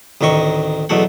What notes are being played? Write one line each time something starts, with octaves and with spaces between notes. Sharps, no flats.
A1 D2 D#3 D#5 C#6
B1 E2 B2 A3 F#5